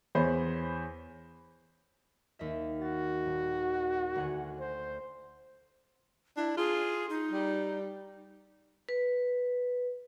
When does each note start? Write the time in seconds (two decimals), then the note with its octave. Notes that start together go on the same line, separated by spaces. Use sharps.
0.15 E2 C5 C#5 B5
2.39 D#2 D#5 E5
2.81 F#4 A6
3.26 D#1
4.15 D2 F#5 G#5
4.59 C5
6.37 D4 E4
6.57 F4 G#4
7.10 D#4
7.31 G3
8.89 B4